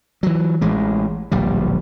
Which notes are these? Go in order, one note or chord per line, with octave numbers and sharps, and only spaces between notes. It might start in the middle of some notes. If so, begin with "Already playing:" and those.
E3 F#3
A1 G#3
D1 A#1 G3